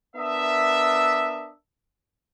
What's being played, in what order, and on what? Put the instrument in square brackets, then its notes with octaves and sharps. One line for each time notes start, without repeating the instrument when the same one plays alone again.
[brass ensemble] B3 D4 A#4 D#5 E5